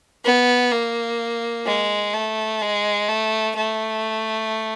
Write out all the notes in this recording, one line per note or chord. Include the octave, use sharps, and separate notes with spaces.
B3
A#3
G#3
A3
G#3
A3
A3